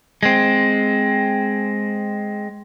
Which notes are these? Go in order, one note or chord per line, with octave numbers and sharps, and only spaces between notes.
G#3 C4